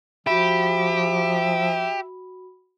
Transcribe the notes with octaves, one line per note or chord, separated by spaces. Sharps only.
F3 F#4 G4 E5 B5